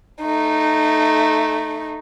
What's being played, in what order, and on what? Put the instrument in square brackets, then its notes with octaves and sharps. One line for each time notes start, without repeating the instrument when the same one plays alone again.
[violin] A3 D#4